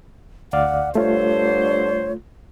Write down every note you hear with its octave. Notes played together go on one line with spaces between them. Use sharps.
D2 D5 F5 F#5
G2 D3 A3 F4 C5 C#5